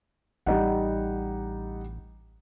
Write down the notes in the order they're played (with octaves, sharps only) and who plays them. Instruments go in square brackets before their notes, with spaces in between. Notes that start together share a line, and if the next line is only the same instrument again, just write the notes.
[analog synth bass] A1 [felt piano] G3 D#4 F#5